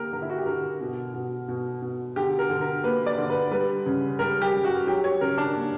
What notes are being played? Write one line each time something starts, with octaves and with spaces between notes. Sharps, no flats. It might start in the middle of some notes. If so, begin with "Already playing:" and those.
Already playing: D3 A#3 G4 A#4
D3 A#4
E4
F#4
G4
D3 A#4
B2
B2
B2
B2
D3 G4
A#4
D3
A#4
A#3 B4
D5
D3
B4
G3 B4
C#3
G3 A#4
G4
G3
F#4
F#3 G4
C#5
C#3 A#4
D4
A#3